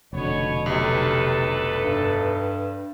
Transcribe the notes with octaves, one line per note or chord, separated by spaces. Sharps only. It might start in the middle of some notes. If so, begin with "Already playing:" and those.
F1 B2 D3 B3 C#5
B1 C3 A4 B4
G2